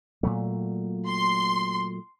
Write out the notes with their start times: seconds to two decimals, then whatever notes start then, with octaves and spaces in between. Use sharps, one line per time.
0.23 A#2 F#3 A3
1.07 C6